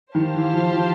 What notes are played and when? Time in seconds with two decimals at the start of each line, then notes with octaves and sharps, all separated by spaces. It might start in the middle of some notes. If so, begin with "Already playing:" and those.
0.14 D#3 G4 C5 F5 A5
0.34 E3
0.53 F3
0.72 F3